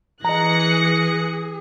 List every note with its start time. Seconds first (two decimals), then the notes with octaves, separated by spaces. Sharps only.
0.25 E3 G#4 D#5 A#5 F#6 A#6 C#7